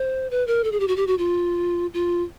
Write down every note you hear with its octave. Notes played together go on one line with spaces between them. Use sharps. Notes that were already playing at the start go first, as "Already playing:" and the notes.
Already playing: C5
B4
A#4
A4
G#4
G4
F#4
G4
F#4
F4
F4